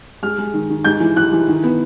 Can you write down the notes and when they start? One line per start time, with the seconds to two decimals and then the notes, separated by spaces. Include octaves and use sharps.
0.22 G#3 F6
0.38 G#3
0.54 D#3
0.70 D#3
0.85 G#2 G6
1.00 E3
1.16 E3 F#6
1.32 E3
1.48 D#3
1.64 B3